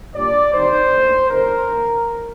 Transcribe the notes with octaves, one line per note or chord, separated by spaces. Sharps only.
A#2 G3 D4 D5
D#3 G3 C4 D#4 C5
A#2 A3 D4
C3 F3 A3 D#4 A#4
D#3 A#3 D#4